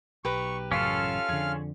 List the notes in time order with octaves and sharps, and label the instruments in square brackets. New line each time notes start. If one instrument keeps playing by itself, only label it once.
[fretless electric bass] B1 [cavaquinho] G4 B4 A#5 [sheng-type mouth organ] C#6
[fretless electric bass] A1 F#2 C#3 [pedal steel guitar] C#4 F4 A4 [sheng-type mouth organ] F5 F6
[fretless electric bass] F2 D3 [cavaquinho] G#4